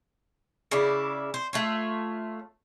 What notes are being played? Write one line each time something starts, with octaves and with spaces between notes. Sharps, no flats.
C#3 E4 D5
C5
A3 F4 C#5